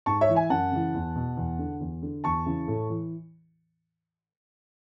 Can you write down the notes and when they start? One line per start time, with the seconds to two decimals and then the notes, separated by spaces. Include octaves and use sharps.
0.06 G#2 A5 C#6
0.21 C#5 E5
0.29 E3
0.35 E5 G#5
0.50 F#2 F#5 A5
0.71 C#3 E3
0.94 E2
1.16 B2
1.37 E2
1.59 D3
1.80 E2
2.02 D3
2.24 E2 A5 C#6
2.46 C#3 E3
2.68 A2
2.90 E3